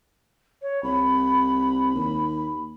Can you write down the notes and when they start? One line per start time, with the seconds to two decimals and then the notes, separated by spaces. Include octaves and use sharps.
0.62 C#5
0.83 C2 B5
1.95 D#2